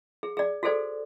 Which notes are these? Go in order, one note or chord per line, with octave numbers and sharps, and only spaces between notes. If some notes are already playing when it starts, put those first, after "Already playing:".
G#4
G#4 D5
F#4 G#4 A4 C5 D5